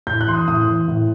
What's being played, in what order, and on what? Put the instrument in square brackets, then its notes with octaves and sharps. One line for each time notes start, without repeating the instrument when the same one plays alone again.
[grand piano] A2 G6
F#6
E3 C6
D#6
A2 D#6
E3
A2